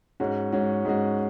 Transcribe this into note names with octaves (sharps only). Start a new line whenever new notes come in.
G#2 G#3 C#4 F#4
G#2 G#3 C#4 F#4
G#2 G#3 C#4 F#4